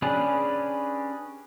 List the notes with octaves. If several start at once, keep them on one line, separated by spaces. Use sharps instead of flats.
C#4 D4 G4 G#4 B4